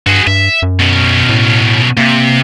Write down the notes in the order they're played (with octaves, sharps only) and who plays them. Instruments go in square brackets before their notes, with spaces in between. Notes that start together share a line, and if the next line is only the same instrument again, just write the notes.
[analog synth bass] G2 [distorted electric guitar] F#4 G#4
[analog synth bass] G2 [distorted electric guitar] E5
[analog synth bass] F#2
[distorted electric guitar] B2 C#4
[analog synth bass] A2
[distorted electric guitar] C3 [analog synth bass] A#3